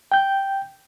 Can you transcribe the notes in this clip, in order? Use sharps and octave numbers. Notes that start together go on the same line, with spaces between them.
G5 G6